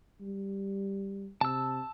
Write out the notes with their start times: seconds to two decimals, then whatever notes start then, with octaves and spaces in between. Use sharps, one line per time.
0.21 G3
1.41 C3 A5 E6